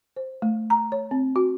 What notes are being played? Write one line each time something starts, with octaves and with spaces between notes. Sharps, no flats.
C5
A3
A#5
C#5
C4
F#4